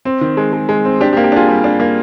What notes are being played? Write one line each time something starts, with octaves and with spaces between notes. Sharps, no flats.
C4
D#3
G#3
G#3
G#3
C4
D4 G4
G4
A#3
G4
D4 F4 G#4
G3
D4
A#3